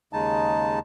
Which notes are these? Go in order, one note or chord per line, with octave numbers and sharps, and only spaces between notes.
D#2 C#3 G#3 D#4 A5